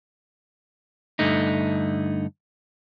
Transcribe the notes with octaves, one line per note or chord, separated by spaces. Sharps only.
G2 D3 A3 D#4